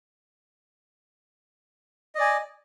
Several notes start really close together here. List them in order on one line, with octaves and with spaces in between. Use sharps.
D#5 D5 G#5